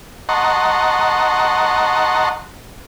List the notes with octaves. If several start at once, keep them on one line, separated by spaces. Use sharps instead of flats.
D#5 F#5 A5 A#5 C6 C#6